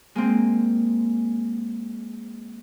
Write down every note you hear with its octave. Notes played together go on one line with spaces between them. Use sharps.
G#3 A#3 C4